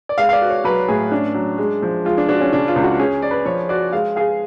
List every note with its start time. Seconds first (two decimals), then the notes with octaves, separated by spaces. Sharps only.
0.09 D5
0.18 G#3 F5
0.29 F5
0.33 D5
0.41 F#4
0.50 C#5
0.64 F#3 B4
0.88 A2 G#4
1.11 C#4 D4
1.34 F#3
1.58 G#3
1.82 F3
2.05 G#3 F4
2.18 D4
2.29 D4 F#4
2.41 C#4
2.52 C#3 D4
2.68 F4
2.76 C#2
2.84 F#4
2.99 C#4 G#4
3.22 D5
3.31 B4
3.45 F3 C#5
3.69 F#4 D5
3.92 G#3 F5
4.16 G#4 F5